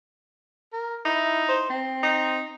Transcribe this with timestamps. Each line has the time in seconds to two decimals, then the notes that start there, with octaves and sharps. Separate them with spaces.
0.73 A#4
1.05 D#4 E4
1.48 C5
1.70 C4
2.03 D#4